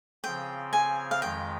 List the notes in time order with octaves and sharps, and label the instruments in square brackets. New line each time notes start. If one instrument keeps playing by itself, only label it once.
[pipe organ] C#3 F3 C4 [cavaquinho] G5
[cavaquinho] G#5
F5
[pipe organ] F2 D#3 G#3 [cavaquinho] G5